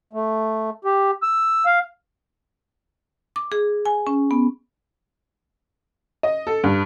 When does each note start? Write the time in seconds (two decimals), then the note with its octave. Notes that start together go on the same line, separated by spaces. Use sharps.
0.13 A3
0.85 G4
1.23 E6
1.66 F5
3.36 D6
3.52 G#4
3.86 G#5
4.07 C#4
4.31 B3
6.23 D#5
6.47 A4
6.64 G2